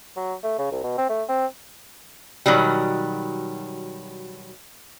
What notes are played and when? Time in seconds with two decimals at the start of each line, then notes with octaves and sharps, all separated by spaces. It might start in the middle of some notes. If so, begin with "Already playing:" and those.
0.17 F#3
0.44 A3
0.59 C#3
0.72 C2
0.84 B2
0.98 C4
1.09 A3
1.29 C4
2.46 B2 D#3 F#3 G3